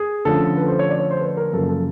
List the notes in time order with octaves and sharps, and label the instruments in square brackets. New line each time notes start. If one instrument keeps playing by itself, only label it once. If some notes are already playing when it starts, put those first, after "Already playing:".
Already playing: [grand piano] G#4
D3 F3 A3 C#4 A4
B4
C5
C#5
D5
C#5
C5
B4
A#4
F#2 C#3 F3 A#3 A4
A4